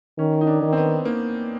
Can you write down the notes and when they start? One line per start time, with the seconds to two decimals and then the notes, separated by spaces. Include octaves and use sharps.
0.18 D#3 C#4
0.41 D#4
0.47 D4
0.62 D#3
0.73 C4
0.77 B3
1.05 A#3